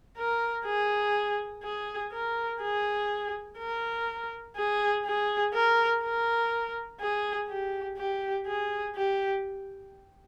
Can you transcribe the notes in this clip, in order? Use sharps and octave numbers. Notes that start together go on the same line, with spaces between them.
A#4
G#4
G#4
A#4
G#4
A#4
G#4
G#4
A#4
A#4
G#4
G4
G4
G#4
G4